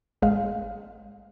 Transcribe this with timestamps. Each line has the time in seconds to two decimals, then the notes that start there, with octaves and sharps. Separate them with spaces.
0.22 A1 G#3 F5